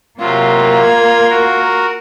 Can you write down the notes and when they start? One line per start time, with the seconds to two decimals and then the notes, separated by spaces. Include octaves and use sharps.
0.20 C3 F#3 A#3 F4
0.82 G#6
1.29 F#4 A#4